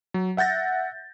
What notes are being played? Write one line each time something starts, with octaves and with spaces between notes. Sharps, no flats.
F#3
E5 F#5 G6 A6 A#6